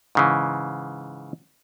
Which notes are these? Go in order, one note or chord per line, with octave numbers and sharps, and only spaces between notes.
G#2 C#3 E3